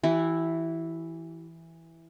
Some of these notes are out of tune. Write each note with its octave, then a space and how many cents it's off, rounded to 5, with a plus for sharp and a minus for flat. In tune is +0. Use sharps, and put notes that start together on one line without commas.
E3 +0 E4 +0 G4 -45